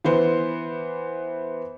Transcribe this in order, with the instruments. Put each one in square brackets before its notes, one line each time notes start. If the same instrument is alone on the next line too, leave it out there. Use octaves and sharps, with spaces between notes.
[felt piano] E3 B3 C5